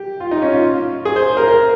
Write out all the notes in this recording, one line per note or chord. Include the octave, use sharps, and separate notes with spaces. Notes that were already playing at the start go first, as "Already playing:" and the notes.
Already playing: G4
F4
D#4
C#4
F4
G#4
C5
A#4
A#4